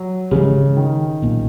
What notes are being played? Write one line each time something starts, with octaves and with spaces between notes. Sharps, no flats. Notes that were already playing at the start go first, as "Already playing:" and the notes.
Already playing: F#3
G#1 G#2 C#3 E3 G#3
D#3
B1 A#2 A#3 C#4